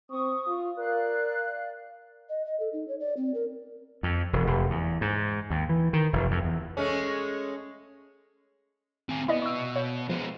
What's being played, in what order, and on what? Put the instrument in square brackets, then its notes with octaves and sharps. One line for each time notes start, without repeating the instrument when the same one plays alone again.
[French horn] C4 [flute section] C#6 D#6
[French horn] F4
[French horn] A#4 [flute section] D5 F5 F#6
[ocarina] D#5
D#5
A4
D#4
C#5
D5
C4
A#4
[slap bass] F2
E1
F1
E2
G#2
D#2
E3
D#3
F1
F2
E2
[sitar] G#3 A3 C#4
[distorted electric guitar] C4 G#4
[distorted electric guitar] B2 [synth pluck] E4 D5 D#5
[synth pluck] C#6 E6
C#5 F5 G6
[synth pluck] F3 [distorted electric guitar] G#3 B3